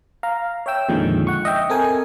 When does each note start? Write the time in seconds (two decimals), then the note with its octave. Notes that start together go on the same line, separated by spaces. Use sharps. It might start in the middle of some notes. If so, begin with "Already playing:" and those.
0.23 F5 A#5
0.66 C#5 E5 G5 E6
0.89 F2 A#2 D3 D#3 F3 G#3
1.27 F#5 C#6
1.45 D#5 E5 G5
1.70 C4 A4 A#4 G#5